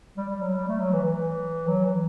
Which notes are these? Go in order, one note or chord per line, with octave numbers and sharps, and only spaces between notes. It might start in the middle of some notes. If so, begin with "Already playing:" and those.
G3
G3
F#3
G3
A3
F#3
E3
E3
F#3
E3